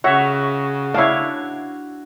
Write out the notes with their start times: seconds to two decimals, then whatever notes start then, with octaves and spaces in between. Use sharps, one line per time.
0.04 C#3 F#4 C#5 E5 F#5
0.94 D4 E4 C#5 F5